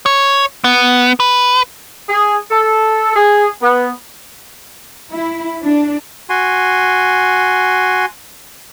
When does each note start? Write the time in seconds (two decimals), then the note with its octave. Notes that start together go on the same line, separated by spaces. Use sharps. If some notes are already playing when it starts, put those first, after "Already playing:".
0.06 C#5
0.64 B3
1.20 B4
2.09 G#4
2.51 A4
3.16 G#4
3.61 B3
5.11 E4
5.63 D4
6.30 F#4 G#5 C6